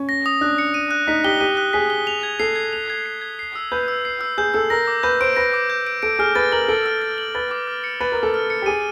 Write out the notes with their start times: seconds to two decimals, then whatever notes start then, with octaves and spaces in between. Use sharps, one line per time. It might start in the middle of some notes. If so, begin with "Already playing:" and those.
Already playing: C#4
0.09 A#6
0.26 D#6
0.41 D4 F#6
0.58 C#7
0.74 D#7
0.91 F#6
1.07 D#4 B6
1.24 G4 G7
1.40 G4 D#7
1.57 F#6
1.73 G#4 B6
1.90 G7
2.07 F7
2.23 G#6
2.40 A4 C7
2.56 G#6
2.73 F7
2.90 G#6
3.06 C7
3.22 G#6
3.39 C7
3.56 E6
3.72 B4 G6
3.88 E6
4.05 C7
4.21 E6
4.38 G#4 G6
4.54 A4 E6
4.70 A#4 A#6
4.87 D6
5.03 B4 G6
5.21 C5 D7
5.36 B4 A#6
5.54 D6
5.70 G6
5.87 D7
6.03 A4 D7
6.19 G#4 F6
6.35 B4 A6
6.52 A#4 F#7
6.68 A4 D7
6.86 F6
7.02 A6
7.18 F#7
7.35 B4 A6
7.51 D6
7.68 F6
7.84 C#7
8.01 B4 A6
8.12 A#4
8.17 D6
8.23 A4
8.34 F6
8.50 C#7
8.62 G4
8.66 G#4 D#7